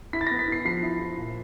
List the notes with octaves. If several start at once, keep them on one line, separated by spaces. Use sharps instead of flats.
E4 B6
A6
A#6
B3
B6
E4 C7
F3 C7
E4
F3
A#2